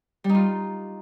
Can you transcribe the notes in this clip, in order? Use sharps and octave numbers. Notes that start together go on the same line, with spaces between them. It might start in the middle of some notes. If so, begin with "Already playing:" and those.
G3
D#4
F4